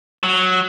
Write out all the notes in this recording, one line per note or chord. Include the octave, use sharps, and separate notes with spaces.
F#3